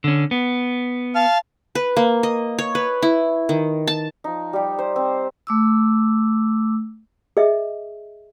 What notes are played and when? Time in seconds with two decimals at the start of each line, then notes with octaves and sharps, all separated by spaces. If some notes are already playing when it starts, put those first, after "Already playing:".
0.04 D3 C#4
0.31 B3
1.15 F5 A5 F6
1.75 B4
1.97 A#3
2.23 D#5
2.59 C#5
2.75 B4
3.02 E4
3.49 D#3
3.87 A5
4.24 F3 D#4
4.53 G3 G4
4.79 C5
4.96 C4
5.47 A3 D6 E6
7.37 G#4 D#5 E5